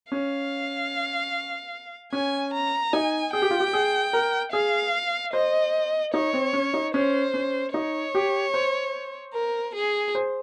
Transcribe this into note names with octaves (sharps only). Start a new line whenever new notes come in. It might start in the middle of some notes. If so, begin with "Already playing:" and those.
C#4 F5
C#4 G#5
A#5
D#4 G#5
G#4 G5
G4
F4
G4
G#4
A#4
G#4 F5
C5 D#5
D#4 C#5
C4
C#4
D#4
C#4 C5
C#4
D#4 C#5
G4
C5
A#4
G#4
C5